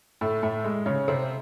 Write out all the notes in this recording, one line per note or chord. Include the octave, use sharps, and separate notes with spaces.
A2 A3
A2 A3
G#3
C#3 C#4
C3 C4